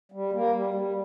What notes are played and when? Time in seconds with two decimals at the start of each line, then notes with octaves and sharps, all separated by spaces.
0.12 G3
0.33 A#3
0.53 G3
0.74 G3